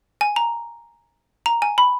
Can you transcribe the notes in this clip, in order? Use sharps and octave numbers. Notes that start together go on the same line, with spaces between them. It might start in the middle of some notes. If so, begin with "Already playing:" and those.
G#5
A#5
A#5
G#5
B5